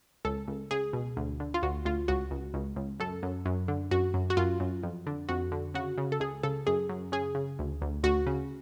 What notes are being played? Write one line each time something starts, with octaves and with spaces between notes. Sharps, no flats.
C#2 A4
C#2
C#2 G#4
B2
D2
D3
F4
D2 F#4
D2 F4
C#2 F#4
C#2
C#2
C#2
F#2 A4
F#2
F#2
D3
F#2 F#4
F#2
F#4
F#2 F4
F#2
F2
D3
F2 F#4
D3
C#3 F#4
C#3
A4
C#2 G#4
C#3 A4
F#2 G#4
F#2
C#3 G#4
C#3
D2
D2
D2 F#4
C#3